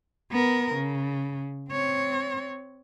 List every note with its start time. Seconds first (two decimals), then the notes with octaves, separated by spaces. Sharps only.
0.31 B3 A#4
0.74 C#3
1.70 C4 C#5